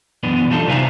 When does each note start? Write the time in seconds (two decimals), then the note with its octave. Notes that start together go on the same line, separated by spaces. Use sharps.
0.23 F#2 B2 E3 B3 D4
0.50 G3 D4 D#4 F4 G#4 A4
0.68 C3 B4 E5 F5 G#5 A#5